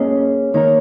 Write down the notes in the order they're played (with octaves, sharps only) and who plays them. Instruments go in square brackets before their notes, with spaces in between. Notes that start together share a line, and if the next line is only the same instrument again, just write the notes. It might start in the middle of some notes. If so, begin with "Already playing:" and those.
Already playing: [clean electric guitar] A#3 C#4 G#4 D#5 [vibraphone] C#5
[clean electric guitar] D#3 A#3 D#4 A#4 [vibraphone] C#5